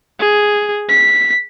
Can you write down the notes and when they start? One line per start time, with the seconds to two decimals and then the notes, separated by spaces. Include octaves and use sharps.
0.20 G#4
0.89 B6